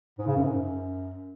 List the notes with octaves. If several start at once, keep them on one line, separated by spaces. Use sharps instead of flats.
G#2
C#3
F#2
G#2
F#2